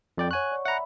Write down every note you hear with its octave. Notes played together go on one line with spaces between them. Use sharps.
F2 D5 G5
C#5 F#5 G#5 C#6 F#6
D5
E5 F#5 A#5 B5